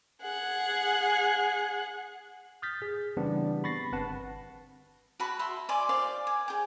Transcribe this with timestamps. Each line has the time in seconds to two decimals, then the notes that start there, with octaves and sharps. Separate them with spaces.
0.22 G#4 F#5
2.62 D#6 F6 G6 A6 B6
2.82 G#4
3.17 C#3 E3 G3 B3 C4 D4
3.64 B5 C#6 A6 A#6 C7
3.92 G1 C4 B4 F#5 A5
5.20 F#4 A5 B5
5.39 E5 C6
5.69 D5 G#5 C6 D6
5.89 C5 D5 F5
6.27 G#5
6.48 G#4 G5